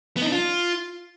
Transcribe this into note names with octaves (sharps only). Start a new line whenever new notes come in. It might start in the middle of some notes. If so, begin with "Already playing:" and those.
B3
D#4
D4
F4